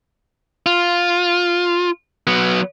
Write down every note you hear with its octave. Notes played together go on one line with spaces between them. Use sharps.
F4
F#3 B3